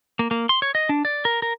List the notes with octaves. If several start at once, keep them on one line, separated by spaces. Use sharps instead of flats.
A#3
A#3
C6
C#5
D#5
D4
D5
A#4
A#4